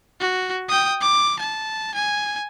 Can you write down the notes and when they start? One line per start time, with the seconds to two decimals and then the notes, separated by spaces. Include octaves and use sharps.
0.20 F#4
0.69 G5 D#6
1.01 D6
1.40 A5
1.95 G#5